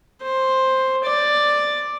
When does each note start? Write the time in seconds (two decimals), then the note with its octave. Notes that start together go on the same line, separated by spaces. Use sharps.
0.22 C5
1.03 D5